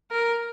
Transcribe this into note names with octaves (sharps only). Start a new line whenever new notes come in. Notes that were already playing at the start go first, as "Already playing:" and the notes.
A#4